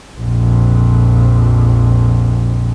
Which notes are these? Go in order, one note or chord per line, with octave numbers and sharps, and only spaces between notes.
A#1 F2